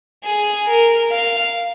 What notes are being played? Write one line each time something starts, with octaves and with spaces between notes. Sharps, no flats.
G#4
A#4
F5